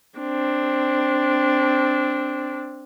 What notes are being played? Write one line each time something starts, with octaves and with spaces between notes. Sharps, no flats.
C4 D4